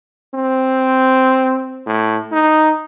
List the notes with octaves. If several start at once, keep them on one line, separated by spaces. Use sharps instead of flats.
C4
A2
D#4